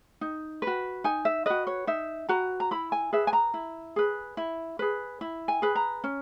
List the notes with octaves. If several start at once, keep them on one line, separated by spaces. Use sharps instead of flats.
D#4
F#4 B4
D#4 G#5
E5
F#4 B4 D#5
C#5
D#4 E5
F#4 B4 A#5
A#5
E4 B5
G#5
G#4 B4 E5
G#5
A#5
E4
G#4 B4
E4
G#4 B4
E4
G#5
G#4 B4
A#5
C#4